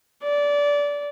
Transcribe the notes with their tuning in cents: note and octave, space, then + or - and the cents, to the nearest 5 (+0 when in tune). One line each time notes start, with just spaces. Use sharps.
D5 -20